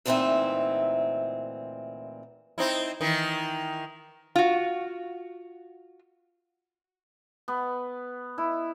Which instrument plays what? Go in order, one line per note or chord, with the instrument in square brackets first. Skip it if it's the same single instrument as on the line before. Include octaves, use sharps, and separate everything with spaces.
[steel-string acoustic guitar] D2 A#2 E3 C4 D#4 E5
[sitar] C4 D#4 E4
D#3 E3
[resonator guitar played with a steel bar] F4 F#4
[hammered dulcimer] B3
E4